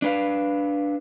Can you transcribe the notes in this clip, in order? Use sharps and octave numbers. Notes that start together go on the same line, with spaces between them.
D4 B4 F5